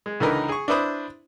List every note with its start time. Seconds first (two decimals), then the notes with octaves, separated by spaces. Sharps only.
0.06 G#3
0.20 C#2 D3 E3 D#4 A#4 B4
0.49 G#4 C#6
0.68 D4 E4 B4 C5 D#6